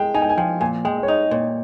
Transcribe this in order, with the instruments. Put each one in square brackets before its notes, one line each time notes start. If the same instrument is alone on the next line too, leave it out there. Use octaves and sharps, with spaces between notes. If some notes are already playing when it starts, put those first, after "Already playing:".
Already playing: [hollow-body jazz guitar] G#3 [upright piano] G5
[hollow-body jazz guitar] D#4 [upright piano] G#5
[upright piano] G5
G#5
[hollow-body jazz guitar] F3 [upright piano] G5
[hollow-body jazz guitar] A#2 [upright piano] G#5
[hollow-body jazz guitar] G#3 [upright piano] G5
[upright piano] D#5
C#5
[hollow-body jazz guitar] D#4 [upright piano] D#5
[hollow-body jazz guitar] A#2 [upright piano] C#5